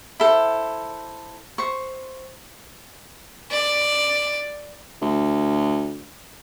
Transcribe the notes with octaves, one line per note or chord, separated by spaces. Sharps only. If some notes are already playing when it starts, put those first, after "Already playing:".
E4 A4 C5
C5 C#6
D5
D2